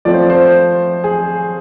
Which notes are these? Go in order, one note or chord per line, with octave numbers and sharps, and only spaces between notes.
F3 A3 C4 D5
C5
C5
G#4